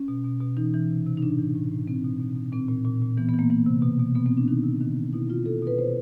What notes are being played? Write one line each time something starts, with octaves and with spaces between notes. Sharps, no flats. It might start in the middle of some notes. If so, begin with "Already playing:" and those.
Already playing: C#4
B2
B2
B2
E3 D#4
E3
C3
C3
D#4
A2 D4
E3
A2
A2
B2 C4
B2
B2
B2
A#2 C4
A#2
A#2
A#2
E3 B3
B3
E3
A#3
E3 A#3
C3
B2
B2
B2 B3
C4
B2
D4
D#3 D#4
C3
D#3
D#3
B2 E4
B2 F4
B2 A4
B2 B4
B2 C5